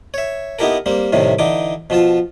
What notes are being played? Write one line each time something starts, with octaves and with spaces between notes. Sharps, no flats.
C#5 E5
B3 D#4 E4 G4 A4 A#4
G3 A#3 C4
A2 C3 D#3 G3
D3 E3 D#4 D6
B2 F3 F4 A5